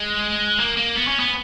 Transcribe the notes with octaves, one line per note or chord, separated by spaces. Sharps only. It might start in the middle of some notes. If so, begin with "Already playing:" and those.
Already playing: G#3
A#3
A#3
B3
C#4
B3